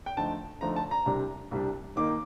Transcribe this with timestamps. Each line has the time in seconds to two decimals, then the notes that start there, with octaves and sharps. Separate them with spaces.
0.06 G5
0.17 D3 F3 A3 D#4 A5
0.61 D3 F3 A3 D#4 A#5
0.76 A5
0.91 A#5
1.06 C2 C3 G3 D4
1.51 C2 C3 G3 D4
1.96 D#2 D#3 A#3 D#4 D6